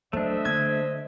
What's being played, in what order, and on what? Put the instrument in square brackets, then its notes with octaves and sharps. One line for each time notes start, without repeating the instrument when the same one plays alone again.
[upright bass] F#3 [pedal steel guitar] A3 D4 [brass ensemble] C5 D#5 E5
[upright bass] D3 [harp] G#6